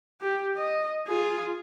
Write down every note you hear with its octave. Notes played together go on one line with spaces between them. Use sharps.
G4
D#5
F4 G#4